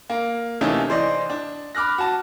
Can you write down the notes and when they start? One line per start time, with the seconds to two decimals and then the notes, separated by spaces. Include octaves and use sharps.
0.10 A#3
0.61 C3 E3 A3 A#3 C#4 D#4
0.89 E3 C5 D5 D#5
1.30 D4
1.75 B5 D6 F6 F#6 A#6
1.98 F#4 A5